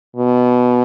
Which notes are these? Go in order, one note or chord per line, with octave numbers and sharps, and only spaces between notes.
B2